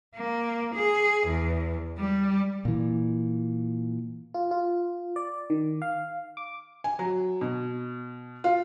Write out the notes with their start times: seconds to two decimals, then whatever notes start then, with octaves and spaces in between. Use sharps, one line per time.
0.17 A#3
0.75 G#4
1.28 E2
1.98 G3
2.65 A#2 E3
4.34 F4
4.51 F4
5.16 D5
5.50 D#3
5.82 F5
6.37 D6
6.84 G#5
6.99 F#3
7.41 B2
8.44 F4